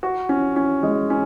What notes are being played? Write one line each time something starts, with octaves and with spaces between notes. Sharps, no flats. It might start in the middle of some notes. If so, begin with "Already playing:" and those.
F#4
C#4
C#4
G#3
C#4